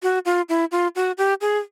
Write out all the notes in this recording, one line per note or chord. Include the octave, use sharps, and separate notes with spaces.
F#4
F4
E4
F4
F#4
G4
G#4